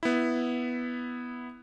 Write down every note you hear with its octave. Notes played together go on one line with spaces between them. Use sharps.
B3 E4